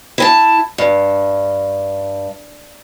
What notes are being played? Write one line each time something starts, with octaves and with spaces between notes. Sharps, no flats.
E4 G#5 A5
G2